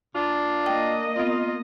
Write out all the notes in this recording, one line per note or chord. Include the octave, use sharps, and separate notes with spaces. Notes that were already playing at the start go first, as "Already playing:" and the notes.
A#2 D4 F4
A#3 D#5 G5 A5
B3 C4 F4